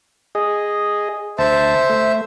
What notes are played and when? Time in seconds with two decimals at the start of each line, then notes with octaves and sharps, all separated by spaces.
0.35 G#4 D#5
1.38 D2 C5 E5 A5
1.90 A3